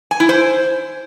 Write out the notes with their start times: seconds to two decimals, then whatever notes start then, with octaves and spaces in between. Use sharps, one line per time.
0.11 G#5
0.20 E4
0.29 C5